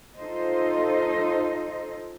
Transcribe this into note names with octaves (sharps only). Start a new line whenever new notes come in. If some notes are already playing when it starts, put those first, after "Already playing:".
D#4 F4 A4 C5 D#5